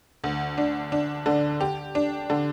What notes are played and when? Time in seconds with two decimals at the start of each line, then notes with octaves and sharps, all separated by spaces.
0.24 D2
0.58 D4
0.92 D4
1.26 D3
1.61 G4
1.95 D4
2.30 D3